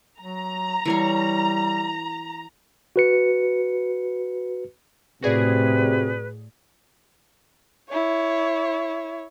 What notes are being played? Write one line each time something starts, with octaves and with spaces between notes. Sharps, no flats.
F#3 A#5
E3 G3 C#5 F5
F#4 B4 C#7
A2 C3 F#4 G#4 B4 D5
E4 C#5